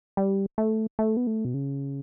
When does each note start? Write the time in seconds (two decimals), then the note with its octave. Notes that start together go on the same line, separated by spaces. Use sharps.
0.17 G3
0.58 A3
0.99 A3
1.17 B3
1.27 A3
1.45 B2
1.54 C#3